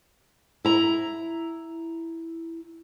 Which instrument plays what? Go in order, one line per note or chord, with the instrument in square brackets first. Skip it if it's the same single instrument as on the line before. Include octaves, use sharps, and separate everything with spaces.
[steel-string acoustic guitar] E4 A#5